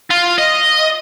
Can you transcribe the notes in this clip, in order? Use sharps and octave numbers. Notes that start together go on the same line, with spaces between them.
F4
D#5